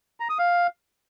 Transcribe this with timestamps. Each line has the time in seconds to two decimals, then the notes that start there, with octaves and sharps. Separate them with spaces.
0.20 A#5
0.29 D#6
0.39 F5